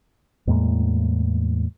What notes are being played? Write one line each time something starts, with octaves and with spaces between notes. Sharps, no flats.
E2 A2 G#3 A#3